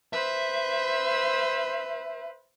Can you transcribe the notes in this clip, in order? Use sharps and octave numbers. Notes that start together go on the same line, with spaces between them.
B4 C5 E5